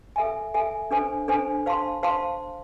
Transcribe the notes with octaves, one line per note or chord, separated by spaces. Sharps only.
A4 E5 G#5
A4 E5 G#5
D4 A4 C5 G#5
D4 A4 C5 G#5
C5 F5 A5 C6
C5 F5 A5 C6